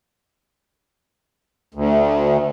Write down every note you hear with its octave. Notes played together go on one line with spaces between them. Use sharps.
D2